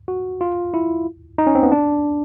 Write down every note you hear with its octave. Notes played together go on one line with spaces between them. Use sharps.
F#4
F4
E4
D#4
C#4
C4
B3
D4